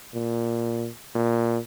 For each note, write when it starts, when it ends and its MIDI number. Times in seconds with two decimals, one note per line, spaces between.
0.14 0.88 46
1.15 1.58 46